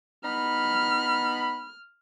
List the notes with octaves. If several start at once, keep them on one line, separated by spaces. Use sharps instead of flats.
B3 D#4 B5 F6